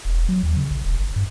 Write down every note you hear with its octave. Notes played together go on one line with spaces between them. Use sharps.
E1
F#3
D#2
C#3
A#1
D#1
G1
G2